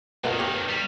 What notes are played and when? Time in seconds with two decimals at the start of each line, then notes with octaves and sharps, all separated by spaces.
0.24 B1 B2 D#3 F4 A#4
0.39 G4 C#5
0.68 G3